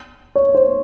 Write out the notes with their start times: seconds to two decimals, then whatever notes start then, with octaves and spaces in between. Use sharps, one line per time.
0.35 C#5
0.55 C5